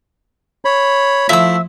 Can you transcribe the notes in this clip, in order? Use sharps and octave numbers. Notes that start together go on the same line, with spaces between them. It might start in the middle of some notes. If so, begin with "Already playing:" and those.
C#5 B5
F3 A3 E4 E5 E6